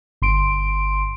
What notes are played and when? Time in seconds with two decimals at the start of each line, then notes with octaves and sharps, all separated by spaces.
0.22 G1 C6 D7